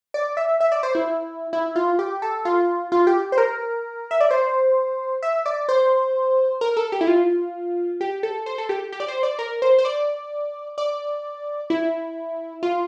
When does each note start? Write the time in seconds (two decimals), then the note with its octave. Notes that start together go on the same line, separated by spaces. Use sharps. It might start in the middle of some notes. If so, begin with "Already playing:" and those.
0.14 D5
0.37 E5
0.60 E5
0.72 D5
0.83 C5
0.95 E4
1.53 E4
1.76 F4
1.99 G4
2.22 A4
2.45 F4
2.92 F4
3.07 G4
3.32 C5
3.38 A#4
4.11 E5
4.21 D5
4.31 C5
5.23 E5
5.46 D5
5.69 C5
6.61 A#4
6.77 A4
6.92 G4
7.01 E4
7.07 F4
8.01 G4
8.23 A4
8.46 C5
8.58 A4
8.69 G4
8.92 G4
9.00 D5
9.08 C5
9.23 D5
9.39 A#4
9.62 C5
9.79 C5
9.85 D5
10.78 D5
11.70 E4
12.63 F4